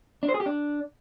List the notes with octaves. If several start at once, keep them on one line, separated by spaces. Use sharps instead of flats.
D4
C5
G#4
G4
D4